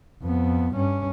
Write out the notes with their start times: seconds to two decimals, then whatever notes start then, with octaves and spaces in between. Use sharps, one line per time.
0.22 F2 B3
0.75 G2 C#4